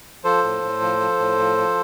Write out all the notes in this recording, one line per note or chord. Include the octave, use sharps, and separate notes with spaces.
F3 A4 C5
A2
A2
F3
F3
A2
F3
F3